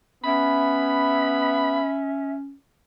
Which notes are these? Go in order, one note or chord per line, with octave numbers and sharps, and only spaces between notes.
B3 C#4 E5 B5